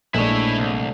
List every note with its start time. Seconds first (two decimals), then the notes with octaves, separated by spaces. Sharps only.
0.14 A#1 G#3 A3 D4 E4 C#5
0.57 C2